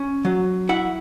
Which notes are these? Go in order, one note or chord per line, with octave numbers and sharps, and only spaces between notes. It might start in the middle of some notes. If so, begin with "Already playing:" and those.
Already playing: C#4
F#3
E4 F#5